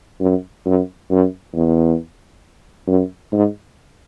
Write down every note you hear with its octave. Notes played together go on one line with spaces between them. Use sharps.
F#2
F#2
F#2
E2
F#2
G#2